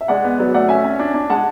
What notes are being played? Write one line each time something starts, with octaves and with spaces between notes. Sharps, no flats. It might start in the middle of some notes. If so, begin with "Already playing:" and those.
E5
G#3 D5 F#5
B3
F#3 B4 D5
A3 D5 F#5
C#4 E5 G#5
C#4
D4
D4
G#3 F#5 A5